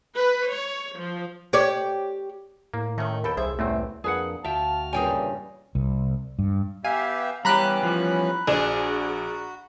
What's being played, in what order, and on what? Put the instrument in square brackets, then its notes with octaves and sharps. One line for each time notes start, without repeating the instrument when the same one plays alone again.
[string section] B4
C#5
F3
[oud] G4 C#5 D5
[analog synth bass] A2 [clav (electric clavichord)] A#3
[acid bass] D#3 [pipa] A3 C#4
[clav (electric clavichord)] D#2 A4 G5 [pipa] B4
[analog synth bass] C2 [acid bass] G#4 [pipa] C5 E5
[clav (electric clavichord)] A1 E2 C4 [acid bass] A3
[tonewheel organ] F2 A#3 D4 [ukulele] G#4 B4 F#5
[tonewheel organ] D2 F#4 F6 [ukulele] E5 G5 [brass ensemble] F5 A5
[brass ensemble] E2 A#2 [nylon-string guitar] G2 C#3 G3 [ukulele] G#4 G5 G#5
[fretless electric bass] C2
G2
[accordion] B3 G4 E5 [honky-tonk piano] F5 [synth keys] G#5
[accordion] E3 B3 C#4 [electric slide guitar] G3 G4 [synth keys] A#5 B5 F#6
[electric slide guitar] F3 G3
[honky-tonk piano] A#1 D5 E7 [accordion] F#4 [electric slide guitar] G#4